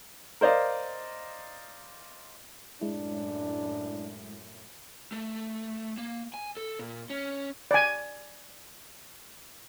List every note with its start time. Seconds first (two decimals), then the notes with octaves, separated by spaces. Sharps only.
0.41 A#4 C5 D5 D#5 F5
2.81 F#2 A2 G#3 D4 E4
5.12 A3
5.98 A#3
6.34 G#5
6.57 A4
6.79 A#2
7.10 C#4
7.71 D5 G#5